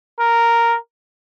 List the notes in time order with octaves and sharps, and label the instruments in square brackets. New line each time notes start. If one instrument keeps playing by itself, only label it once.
[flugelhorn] A#4